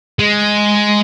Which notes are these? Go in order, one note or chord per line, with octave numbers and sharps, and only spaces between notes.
G#3